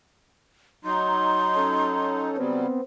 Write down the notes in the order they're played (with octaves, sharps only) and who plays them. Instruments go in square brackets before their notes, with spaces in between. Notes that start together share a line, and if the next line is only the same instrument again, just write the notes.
[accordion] F#3 D#4 [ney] C6
[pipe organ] C#4 A4
[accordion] C#3 F#3 G3 [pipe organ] B3 C4